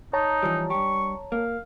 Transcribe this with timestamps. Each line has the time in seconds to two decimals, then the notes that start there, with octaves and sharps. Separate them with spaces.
0.13 D#4 C#5 A5 A#5
0.43 E3 F3 G3
0.70 G2 G4 C#6
1.32 A#3 F5